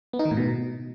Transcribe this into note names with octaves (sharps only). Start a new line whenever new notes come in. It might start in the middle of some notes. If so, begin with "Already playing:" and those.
B3
D#4
D#3
A2
B2